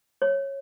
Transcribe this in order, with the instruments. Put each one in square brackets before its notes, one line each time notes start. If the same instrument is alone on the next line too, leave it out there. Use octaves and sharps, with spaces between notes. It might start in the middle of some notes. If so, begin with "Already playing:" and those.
[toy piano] C#5